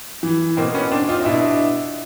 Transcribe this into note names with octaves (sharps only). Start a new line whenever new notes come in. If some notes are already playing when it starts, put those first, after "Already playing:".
E3
B2 A#3 C4
B3 C#4
C4 D4
D#4 F4
D#4
B2 D4 E4